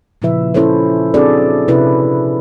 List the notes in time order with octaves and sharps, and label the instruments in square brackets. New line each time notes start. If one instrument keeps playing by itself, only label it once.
[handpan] A#2 C#3 F3 E4 B4 E5
C#4 E4 F4 A4 C5 C#5
C4 D4 F#4 G#4 A4 D5
C3 C#4 E4 B4